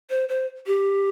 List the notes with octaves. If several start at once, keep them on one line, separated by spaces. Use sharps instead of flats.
C5
C5
G4